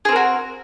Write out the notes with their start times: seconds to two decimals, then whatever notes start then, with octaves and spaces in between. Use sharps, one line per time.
0.05 G#4
0.09 C4
0.12 A#4
0.16 F#4